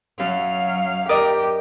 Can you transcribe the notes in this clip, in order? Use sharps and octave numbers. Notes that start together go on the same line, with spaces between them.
F#2 F#3 F5
G4 A#4 D5 D#5